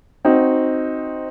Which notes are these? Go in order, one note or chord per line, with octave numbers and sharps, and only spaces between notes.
C4 D#4 F#4